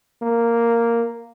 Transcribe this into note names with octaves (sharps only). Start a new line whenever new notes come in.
A#3